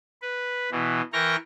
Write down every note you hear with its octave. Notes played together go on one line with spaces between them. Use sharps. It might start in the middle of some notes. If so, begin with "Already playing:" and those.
B4
B2 E3
E3 A#4 G5 C#6 F6 A#6